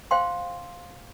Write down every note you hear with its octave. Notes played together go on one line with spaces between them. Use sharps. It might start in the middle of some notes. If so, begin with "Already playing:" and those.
C5 F5 G5 C6